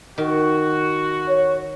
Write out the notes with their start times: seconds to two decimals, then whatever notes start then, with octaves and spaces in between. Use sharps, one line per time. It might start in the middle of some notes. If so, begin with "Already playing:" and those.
0.18 D#3 F#4
1.29 C#5